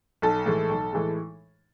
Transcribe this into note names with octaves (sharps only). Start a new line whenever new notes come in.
B1 A4
A2 E3 G#3
B1
A2 E3 G#3